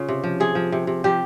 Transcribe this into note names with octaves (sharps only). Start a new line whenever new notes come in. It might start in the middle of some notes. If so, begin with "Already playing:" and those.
Already playing: C#3 F4
C3
F3
C3 G#4
F3
C3
C3
F3 G4